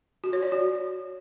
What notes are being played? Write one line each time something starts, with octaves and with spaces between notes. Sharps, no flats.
F#4
C#5
D5
F#4